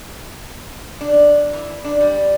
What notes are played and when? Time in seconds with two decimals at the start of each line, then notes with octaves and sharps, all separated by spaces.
1.01 D4
1.53 E3
1.84 D4
2.01 G3